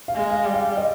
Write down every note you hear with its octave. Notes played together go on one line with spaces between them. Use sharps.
F5
G#3
F5
G3
F5
D#5